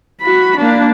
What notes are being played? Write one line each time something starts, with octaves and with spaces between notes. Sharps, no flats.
F#4 B5
A#3 D4